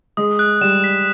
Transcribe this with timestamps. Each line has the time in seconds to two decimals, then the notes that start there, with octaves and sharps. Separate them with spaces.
0.17 G#3 D#6
0.39 F#6
0.61 G3 E7
0.84 B6